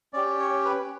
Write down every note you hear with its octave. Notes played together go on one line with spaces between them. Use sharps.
C#4 G4 D5
C#5
B4